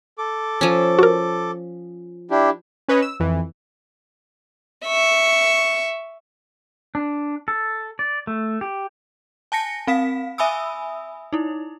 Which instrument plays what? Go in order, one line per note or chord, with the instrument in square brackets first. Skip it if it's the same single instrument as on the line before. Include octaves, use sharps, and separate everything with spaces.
[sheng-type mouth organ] A4 D6
[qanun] F3 C#4
[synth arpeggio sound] F#4 A#4
[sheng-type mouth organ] D4 E4 G4
[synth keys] C#4 B4 C#5 D#5
E6
F2 E3
[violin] E5 C#6
[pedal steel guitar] D4
A4
D5
A3
G4
[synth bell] G#5 A5 A#6 C#7
C4 F5 B6
E5 G#5 B5 D#6 E6
D#4 E4